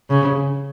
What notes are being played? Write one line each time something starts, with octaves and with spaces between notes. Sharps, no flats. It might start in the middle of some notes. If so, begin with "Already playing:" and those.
C#3